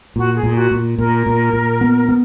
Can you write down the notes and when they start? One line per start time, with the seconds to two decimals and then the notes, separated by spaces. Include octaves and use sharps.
0.16 A#2 F#4
0.36 G#4
0.43 A#2
0.57 F#4
0.71 A#2
0.98 A#2 A#4
1.26 A#2
1.53 A#2
1.81 B3
2.09 B3